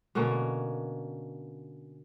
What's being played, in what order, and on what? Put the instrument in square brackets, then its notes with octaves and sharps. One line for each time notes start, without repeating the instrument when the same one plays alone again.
[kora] B2 D3 A#3 C#4